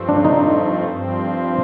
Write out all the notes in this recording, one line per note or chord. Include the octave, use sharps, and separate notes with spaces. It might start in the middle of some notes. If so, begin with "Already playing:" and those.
Already playing: G2 F3 A3 C4
D4
D#4
G2 F3 C4